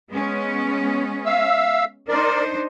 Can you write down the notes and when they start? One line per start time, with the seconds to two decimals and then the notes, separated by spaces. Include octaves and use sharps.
0.11 G#3 B3 C#4
1.26 E5 F5 E6
2.08 D4 D#4 A#4 C5 D5